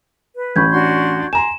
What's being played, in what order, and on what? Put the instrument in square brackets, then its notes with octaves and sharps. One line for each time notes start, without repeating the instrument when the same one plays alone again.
[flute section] B4
[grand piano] A1 C#4 B5 [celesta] C#6 G6 G#6
[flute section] D4 F#4 C6
[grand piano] G#5 A#5 C6 [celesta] E7